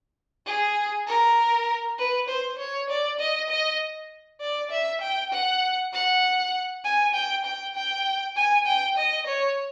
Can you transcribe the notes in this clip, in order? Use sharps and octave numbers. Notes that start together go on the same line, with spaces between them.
G#4
A#4
B4
C5
C#5
D5
D#5
D#5
D5
E5
G5
F#5
F#5
G#5
G5
G5
G5
G#5
G5
D#5
C#5